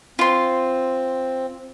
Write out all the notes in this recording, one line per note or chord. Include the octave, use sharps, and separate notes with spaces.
C4 F4 C6